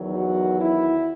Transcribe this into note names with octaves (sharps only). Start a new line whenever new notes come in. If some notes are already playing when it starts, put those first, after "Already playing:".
Already playing: E2 D#3 F#3
F#4
E4